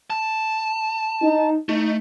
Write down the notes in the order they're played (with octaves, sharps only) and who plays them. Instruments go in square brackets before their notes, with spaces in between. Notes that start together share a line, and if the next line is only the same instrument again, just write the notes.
[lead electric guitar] A5
[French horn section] D#4
[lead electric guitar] A3 [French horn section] D#4